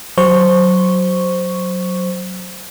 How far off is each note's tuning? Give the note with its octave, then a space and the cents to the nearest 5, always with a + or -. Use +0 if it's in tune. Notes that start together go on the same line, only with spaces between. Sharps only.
F#3 +0 C5 +0 C#6 +0